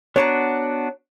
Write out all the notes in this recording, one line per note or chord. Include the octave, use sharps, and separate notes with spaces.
B3 D4 F#4 C#5 A5 A#5